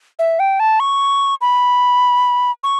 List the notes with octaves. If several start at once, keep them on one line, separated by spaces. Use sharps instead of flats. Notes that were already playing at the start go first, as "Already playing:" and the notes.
E5
G5
A5
C#6
B5
C#6